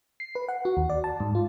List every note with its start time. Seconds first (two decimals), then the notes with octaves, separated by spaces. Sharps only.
0.20 C7
0.35 B4
0.49 F#5
0.65 F#4
0.77 D#2
0.90 D5
1.04 A5
1.20 G#2
1.35 F4